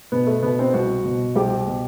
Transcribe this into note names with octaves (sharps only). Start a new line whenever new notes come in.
B2 B3
A3
B2 B3
C4
C2 F#4
B2
C2 G4
B2